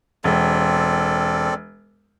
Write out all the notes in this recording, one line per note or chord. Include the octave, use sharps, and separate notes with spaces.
E1 C4 A4 D5